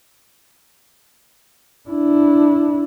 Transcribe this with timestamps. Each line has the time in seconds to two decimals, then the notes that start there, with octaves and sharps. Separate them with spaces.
1.89 D4 E4